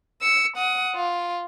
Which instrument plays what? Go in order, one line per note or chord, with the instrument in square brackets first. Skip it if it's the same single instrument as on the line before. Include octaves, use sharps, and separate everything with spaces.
[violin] E6 C#7
F#5 D#6
F4